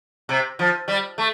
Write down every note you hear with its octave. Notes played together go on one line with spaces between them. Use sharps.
C3
F3
G3
A3